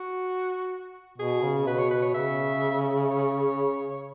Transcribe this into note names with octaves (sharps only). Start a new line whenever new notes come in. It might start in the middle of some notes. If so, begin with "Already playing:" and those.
Already playing: F#4
B2 G#4
C#3
B2 B4
C#5
B4
C#5
C#3 E5
C#5